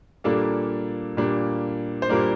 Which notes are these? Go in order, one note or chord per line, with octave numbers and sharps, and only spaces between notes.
A#2 G3 A#3 D4 A4
A#2 G3 A#3 D4
C5
A#2 G3 A#3 D4 A#4